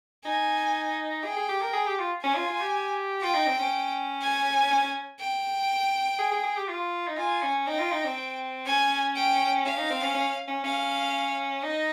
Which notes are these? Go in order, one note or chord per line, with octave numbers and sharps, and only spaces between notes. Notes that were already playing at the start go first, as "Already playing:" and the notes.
D#4 G#5
G#4 G5
G#4
G4
A#4
G#4
G4
F4
C#4 G#5
F4
F4
G4
F4 G5
D#4
C4
C#4
G#5
C#4
C#4
G5
G#4
G#4
G#4
G4
F4
D#4
F4 G#5
C#4
D#4 G5
F4
D#4
C4
C#4 G#5
G5
C#4 F5
D#4
C4
C#4
C#4
C#4
C#4 F5
D#4 D#5